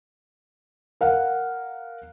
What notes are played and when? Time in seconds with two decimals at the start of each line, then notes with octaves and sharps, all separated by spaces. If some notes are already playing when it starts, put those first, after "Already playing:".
1.01 A#4 F5 F#5